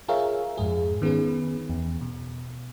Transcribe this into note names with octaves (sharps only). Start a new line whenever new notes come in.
F4 G#4 A#4 C#5 E5 F5
F2 G#2 G#4
D#3 B3 C#4 G#4 B4
E2
B2